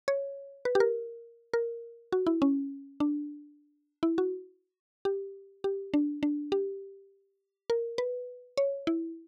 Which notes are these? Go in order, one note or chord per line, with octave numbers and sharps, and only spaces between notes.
C#5
B4
G4
A#4
A#4
F#4
E4
C#4
D4
E4
F#4
G4
G4
D4
D4
G4
A#4
B4
C#5
E4